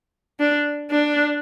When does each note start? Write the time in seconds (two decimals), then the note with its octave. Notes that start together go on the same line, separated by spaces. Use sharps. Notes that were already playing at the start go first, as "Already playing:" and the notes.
0.40 D4
0.90 D4